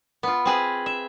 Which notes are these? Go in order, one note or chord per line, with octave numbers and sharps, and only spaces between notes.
B3 F4
C4 G#4 B4
E5